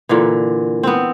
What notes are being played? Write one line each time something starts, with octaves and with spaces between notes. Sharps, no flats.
A#2 D3 E3
B3 C4